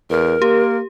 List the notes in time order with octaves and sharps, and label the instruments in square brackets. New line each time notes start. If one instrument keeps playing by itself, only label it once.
[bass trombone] E2 [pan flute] A#4
[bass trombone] A#3 [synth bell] G4